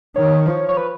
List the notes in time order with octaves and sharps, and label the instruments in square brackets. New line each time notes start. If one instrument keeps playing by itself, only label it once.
[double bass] D#3 [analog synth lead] C#5
[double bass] F3
[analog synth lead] C#5
B4